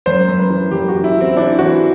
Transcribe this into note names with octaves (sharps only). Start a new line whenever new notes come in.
F#2 C5
F#2
B4
E3
F#2 G4
F#4
E3
E4
E3
C4
E3 D4
E3 F#4